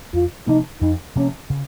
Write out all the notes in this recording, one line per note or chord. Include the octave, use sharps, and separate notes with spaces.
F2 F4
C3 F3 A#3 D#4
F2 D#4
C3 F3 A#3 C#4
C#3